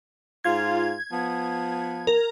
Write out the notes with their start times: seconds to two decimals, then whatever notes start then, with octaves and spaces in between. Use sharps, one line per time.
0.44 G#2 F4 G#6
1.11 F3 B3
2.07 A#4